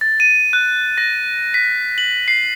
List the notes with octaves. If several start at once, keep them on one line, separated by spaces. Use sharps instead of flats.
A6
D#7
F#6
A#6
B6
F#7
C7